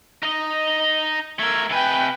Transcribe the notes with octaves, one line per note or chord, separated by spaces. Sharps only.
D#4 D#5
A3 A#4 E6 G#6
C3 B4 G5 G#5